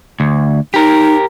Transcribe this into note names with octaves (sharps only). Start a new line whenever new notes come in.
D2
D#4 G4 A#4